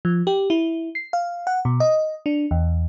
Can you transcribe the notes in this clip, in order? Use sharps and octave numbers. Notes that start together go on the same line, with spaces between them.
F3
G4
E4
C7
F5
F#5
B2
D#5
D4
E2